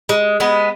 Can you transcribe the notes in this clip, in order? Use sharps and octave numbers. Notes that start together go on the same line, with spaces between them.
G#3
G#3 B3